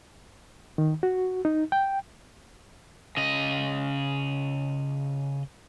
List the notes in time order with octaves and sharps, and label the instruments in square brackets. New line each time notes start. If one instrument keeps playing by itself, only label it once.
[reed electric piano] D#3
F#4
D#4
G5
[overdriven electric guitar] C#3 D#5